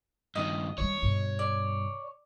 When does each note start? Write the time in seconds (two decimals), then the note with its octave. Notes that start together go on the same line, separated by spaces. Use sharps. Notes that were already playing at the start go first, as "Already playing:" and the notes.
0.35 G2 D#3 D#5
0.78 D#3 G3 C#5
1.02 G2 B2
1.39 D5